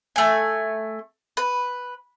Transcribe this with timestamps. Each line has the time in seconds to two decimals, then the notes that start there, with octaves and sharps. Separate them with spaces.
0.16 A3 G#5
1.37 B4